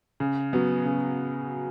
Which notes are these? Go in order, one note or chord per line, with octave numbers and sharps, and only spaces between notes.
C#3
F#3 B3
C#3